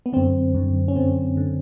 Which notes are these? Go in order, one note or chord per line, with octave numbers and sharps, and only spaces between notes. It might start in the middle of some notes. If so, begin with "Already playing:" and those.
B3
F#2 D3 C4
F#2 D3
C#4
F#2 D3 C4
D3